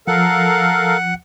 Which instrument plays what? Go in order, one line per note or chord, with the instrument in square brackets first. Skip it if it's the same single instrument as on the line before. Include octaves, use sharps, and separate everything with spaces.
[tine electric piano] F3 [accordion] A4 A#4 F5 [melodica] F#5